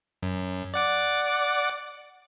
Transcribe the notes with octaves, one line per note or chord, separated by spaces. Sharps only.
F#2
D5 F#5 D6